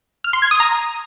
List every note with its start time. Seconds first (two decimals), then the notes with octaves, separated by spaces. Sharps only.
0.24 F6
0.33 C6
0.42 G#6
0.51 D#6
0.60 A#5